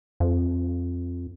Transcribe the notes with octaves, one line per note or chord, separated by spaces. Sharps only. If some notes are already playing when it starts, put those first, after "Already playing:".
F2